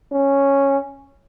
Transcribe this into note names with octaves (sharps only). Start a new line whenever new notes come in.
C#4